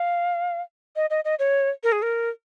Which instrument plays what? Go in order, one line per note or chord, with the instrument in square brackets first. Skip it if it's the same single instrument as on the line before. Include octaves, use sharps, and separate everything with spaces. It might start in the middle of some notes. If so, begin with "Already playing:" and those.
Already playing: [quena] F5
D#5
D#5
D#5
C#5
A#4
G#4
A#4